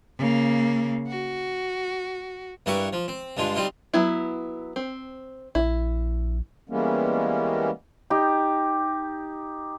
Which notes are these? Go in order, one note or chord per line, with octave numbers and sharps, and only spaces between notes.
C#3 A#3
F#4
G2 G3 E4 A#4 B4 C#6
F3
C4
G2 D3 G#3 F4
G3 C4 D#4 F4
F#3 B3 E4
C4
A#1 E4
E3 G3 G#3 A#3 B3 C#4
D#4 G4